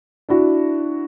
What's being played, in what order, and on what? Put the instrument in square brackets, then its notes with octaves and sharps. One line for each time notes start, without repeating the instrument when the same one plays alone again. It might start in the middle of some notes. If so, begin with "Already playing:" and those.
[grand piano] D4 E4 F#4